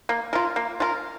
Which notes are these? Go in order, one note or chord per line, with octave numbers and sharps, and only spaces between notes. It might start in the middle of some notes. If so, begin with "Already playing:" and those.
A#3
F4 A#4
A#3
F4 A#4